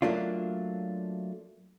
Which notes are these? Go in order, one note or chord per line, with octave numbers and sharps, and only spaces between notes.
F#3 A3 A#3 D4 F4